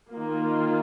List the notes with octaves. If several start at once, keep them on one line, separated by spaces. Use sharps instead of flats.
D#3 A#3 F4